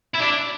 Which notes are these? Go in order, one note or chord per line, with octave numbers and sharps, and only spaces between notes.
E4
D4